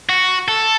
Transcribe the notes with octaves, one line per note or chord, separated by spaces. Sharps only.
F#4
A4